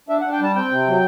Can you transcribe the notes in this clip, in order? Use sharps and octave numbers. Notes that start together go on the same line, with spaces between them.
D4 E5
F#5
D4
G5
G3 A5
C4 G5
C3
F#3